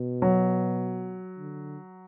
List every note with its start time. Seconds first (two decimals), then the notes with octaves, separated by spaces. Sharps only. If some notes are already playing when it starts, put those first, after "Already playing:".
Already playing: B2
0.22 F#3
1.38 D3